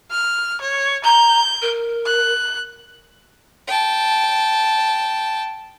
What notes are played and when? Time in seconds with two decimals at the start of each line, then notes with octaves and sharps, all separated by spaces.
0.11 F6
0.61 C#5
1.04 A#5 G6
1.62 A#4
2.06 F#6
3.68 G5 A5